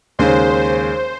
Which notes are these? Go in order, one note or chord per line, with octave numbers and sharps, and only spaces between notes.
D#2 C#3 G#3 C#4 C5
C5